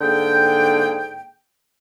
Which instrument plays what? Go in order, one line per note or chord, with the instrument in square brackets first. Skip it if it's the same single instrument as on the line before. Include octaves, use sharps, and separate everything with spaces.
[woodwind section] G#2 D3 A#3 G#4 G5